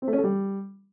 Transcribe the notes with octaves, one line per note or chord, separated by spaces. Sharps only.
C4
A3
C#4
A4
G3